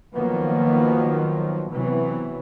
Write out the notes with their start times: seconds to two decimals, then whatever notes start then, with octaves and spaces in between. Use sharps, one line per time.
0.14 D#3 F3 F#3 A#3 B3
1.70 C3 E3 F#3 B3